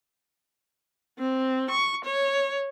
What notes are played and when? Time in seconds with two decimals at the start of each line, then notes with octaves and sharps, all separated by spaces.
1.19 C4
1.71 C#6
2.05 C#5